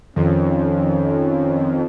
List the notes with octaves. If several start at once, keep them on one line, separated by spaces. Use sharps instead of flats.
F2 D#3 C#4